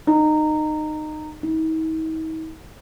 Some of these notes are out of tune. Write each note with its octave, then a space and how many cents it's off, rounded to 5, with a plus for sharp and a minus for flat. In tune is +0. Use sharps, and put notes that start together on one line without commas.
D#4 -20
D#4 +45